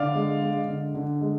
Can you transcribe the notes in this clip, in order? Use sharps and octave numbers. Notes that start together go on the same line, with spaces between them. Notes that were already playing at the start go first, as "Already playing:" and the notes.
Already playing: D3 D5 F5
G#3
G#3
D3
D3
G#3